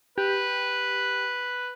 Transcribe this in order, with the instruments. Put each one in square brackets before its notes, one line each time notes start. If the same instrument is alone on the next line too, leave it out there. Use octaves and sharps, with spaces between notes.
[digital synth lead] G4 [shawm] B4